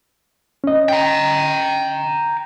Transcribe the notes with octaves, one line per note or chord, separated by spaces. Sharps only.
C#4 D#5
G5 A#5